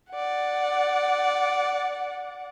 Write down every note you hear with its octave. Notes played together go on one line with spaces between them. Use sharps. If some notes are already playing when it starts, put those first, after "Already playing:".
D5 F#5